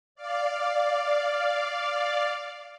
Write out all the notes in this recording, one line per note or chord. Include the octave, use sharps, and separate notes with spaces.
D5 F5